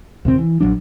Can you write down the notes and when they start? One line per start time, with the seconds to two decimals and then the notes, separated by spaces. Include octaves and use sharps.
0.25 D#2 C3 C4
0.38 E3
0.60 A#1 D#2 F#3 D4